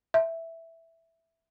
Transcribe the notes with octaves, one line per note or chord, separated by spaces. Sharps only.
E5